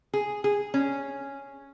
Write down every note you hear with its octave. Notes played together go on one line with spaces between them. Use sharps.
G#4
G#4
C#4